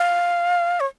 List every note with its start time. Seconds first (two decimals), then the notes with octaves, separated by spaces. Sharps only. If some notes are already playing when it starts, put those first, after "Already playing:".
Already playing: F5
0.80 C#5